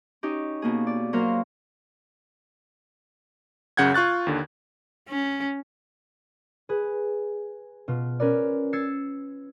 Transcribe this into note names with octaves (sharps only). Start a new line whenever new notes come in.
C#4 D#4 G4
B2 A#3 G#4
D5
F#3 A#3 A#4 C5 F5
F#2 C#3 F#5 G6 G#6
F4 C#6 F#6 A6
D#2 D3
C#4
G#4 B4
B2 F4
C#4 A#4 B4 D5
E6 G#6 A6 C7 C#7